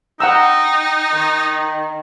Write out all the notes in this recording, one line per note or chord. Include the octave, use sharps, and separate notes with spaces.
D#4 F#5 G5 A#5 E6
D#3